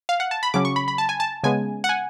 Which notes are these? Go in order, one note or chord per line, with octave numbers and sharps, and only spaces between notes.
F5
F#5
A5
B5
C#3 F#3 C#4 D6
C#6
B5
B5
A5
G#5
A5
C#3 G#3 B3 G#5
F#5
G#5